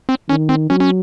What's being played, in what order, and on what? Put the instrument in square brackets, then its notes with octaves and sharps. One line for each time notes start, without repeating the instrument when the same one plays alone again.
[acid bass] C4
[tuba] D#3 [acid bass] C#4
[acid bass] C4
[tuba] F#3 [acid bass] C#4
[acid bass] C#4